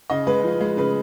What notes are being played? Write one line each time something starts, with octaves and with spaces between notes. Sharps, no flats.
C#3 D#5
G#3 B4
F3
G#3
C#3 B4